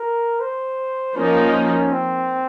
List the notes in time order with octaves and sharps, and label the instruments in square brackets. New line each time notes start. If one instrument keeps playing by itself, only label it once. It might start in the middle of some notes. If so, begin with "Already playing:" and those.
Already playing: [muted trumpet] A#4
C5
[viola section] F3 A#3 D#4 [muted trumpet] C#4
[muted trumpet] C4